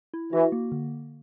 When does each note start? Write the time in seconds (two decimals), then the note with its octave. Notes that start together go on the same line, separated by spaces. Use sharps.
0.14 E4
0.33 E3 F#4
0.52 A#3
0.72 D3